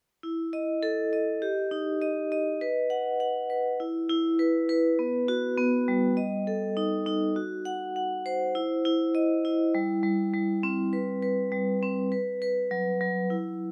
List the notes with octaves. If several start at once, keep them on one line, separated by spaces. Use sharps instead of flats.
E4
D#5
A4
D#5
G4
D#4
D#5
D#5
B4
F#5
F#5
B4
E4
E4
B4
B4
B3
F#4
B3
G3
D#5
A4
D#4
D#4
F#4
F#5
F#5
C5
E4
E4
D#5
E4
G3
G3
G3
C4
B4
B4
G3
C4
B4
B4
F#3
F#3
E4